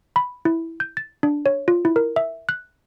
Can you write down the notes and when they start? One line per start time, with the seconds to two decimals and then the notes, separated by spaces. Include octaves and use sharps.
0.16 B5
0.45 E4
0.80 G6
0.97 A6
1.23 D4
1.46 C#5
1.68 F4
1.85 E4
1.96 A#4
2.16 E5
2.49 F#6